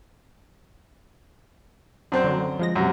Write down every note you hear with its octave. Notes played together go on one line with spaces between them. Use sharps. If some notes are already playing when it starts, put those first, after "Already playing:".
F#2 C4 D4 C5
D3 F#3
D3
F3 G#3 A#6
F#2 C3